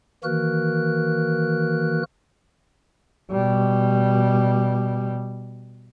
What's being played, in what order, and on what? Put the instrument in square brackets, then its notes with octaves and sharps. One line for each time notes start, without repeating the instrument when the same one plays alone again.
[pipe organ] D#3 E3 A#3 F#4 A#4 F#6
[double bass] B2 G3